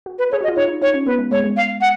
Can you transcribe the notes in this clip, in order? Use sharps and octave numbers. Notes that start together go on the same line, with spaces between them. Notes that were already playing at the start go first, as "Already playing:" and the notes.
F#4
B4
G#4 C#5
F#4
D#5
F4
D#4 C#5
D#4
D#4 C#5
C#4
B3 B4
G#3
G#3 C#5
G#3
F5
F#5